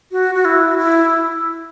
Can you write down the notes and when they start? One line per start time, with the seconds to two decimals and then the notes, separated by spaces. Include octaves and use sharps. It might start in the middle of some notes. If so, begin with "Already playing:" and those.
0.12 F#4
0.35 F#4
0.45 E4
0.78 E4